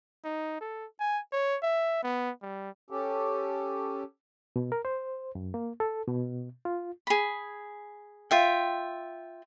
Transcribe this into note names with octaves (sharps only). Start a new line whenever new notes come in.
D#4
A4
G#5
C#5
E5
B3
G3
C#4 G4 A4
B2
A#4
C5
F#2
A#3
A4
B2
F4
G#4 B5
F4 E5 G5